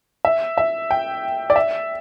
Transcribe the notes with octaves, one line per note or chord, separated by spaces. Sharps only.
E5
E5
G5
D5
E5